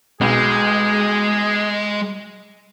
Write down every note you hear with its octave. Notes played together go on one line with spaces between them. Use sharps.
B1 G#3 G#4